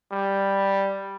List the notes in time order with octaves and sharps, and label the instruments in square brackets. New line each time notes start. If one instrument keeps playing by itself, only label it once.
[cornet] G3